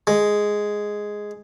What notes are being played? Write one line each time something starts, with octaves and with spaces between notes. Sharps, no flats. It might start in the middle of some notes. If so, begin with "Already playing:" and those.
G#3